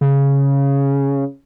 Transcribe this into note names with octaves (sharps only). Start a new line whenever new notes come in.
C#3